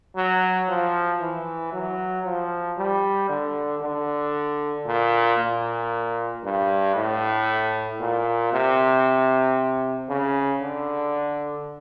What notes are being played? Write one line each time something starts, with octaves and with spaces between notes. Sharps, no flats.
F#3
F3
E3
F#3
F3
G3
D3
D3
A#2
A#2
G2
A2
A#2
C3
C#3
D3